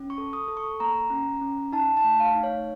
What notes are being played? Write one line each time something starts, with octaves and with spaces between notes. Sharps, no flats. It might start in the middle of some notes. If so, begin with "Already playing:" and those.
Already playing: C#4
C#6
A4
D#6
A4
C#6
A#3 A#5
C#4
C#4
D#4 A5
A5
A3
F5
D#4
C#5